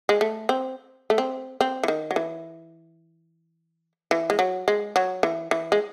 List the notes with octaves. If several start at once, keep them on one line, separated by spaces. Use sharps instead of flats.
G#3
A3
C4
A3
C4
C4
E3
D#3
F#3
E3
E3
G#3
F#3
G#3
F#3
E3
E3
G#3